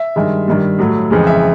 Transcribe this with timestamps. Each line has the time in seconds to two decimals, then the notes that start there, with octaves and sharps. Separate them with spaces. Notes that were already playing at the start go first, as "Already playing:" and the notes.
Already playing: E5
0.16 G2 D#3 G#3
0.48 G2 D#3 G3
0.78 A2 F#3 A3
1.10 F2 C#3 E3 G#3
1.27 E5